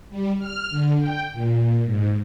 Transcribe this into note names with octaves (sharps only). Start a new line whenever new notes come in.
G3
F6
D3
G5
A#2
G#2